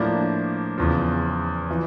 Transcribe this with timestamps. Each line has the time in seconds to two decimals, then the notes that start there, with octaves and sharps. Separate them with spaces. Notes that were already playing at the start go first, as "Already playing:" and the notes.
Already playing: A2 F3 A#3 D4
0.78 E2 C#3 F3
1.71 E3